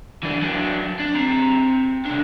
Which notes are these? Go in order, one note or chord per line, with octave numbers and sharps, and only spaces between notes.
E3 D4
F#3 D4
D4
C4 A#5
C3 D4